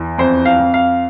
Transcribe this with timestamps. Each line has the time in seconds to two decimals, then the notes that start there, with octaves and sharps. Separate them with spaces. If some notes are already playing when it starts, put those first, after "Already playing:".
Already playing: E2
0.18 F2 C5
0.45 F5
0.60 F2
0.74 F5